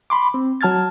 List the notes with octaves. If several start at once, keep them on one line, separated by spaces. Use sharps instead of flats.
B5 C6 D6
C4
F#3 A5 F6 G#6 A6